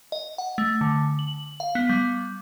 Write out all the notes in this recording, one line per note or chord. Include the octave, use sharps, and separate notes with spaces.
D#5
F#5
A3
D3
F#7
F5
B3
G3